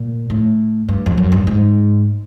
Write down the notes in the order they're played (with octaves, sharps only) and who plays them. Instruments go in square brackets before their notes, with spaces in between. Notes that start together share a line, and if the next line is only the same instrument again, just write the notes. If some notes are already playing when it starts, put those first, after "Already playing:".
Already playing: [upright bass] A#2
A2
G2
F2
F#2
G2
G#2